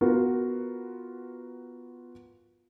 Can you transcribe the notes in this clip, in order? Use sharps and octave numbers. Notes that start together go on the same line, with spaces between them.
B3 F4 F#4 A#4